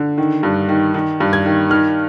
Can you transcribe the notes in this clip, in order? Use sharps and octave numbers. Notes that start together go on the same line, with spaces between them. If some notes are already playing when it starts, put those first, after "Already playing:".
Already playing: D3
D#3
G2
D#3
D#3
G2
G#6
D#3
D#3 F6